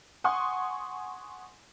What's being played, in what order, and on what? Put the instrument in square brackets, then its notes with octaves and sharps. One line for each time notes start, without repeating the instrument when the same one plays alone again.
[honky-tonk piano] F#5 G#5 C6 C#6 D#6